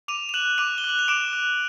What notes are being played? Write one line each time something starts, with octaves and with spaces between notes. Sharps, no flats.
D6 D#7 F7
F7
F#6 E7 F#7
D6 D#7 F7
G7
F#6 F#7
F7
D6 D7 E7
F#6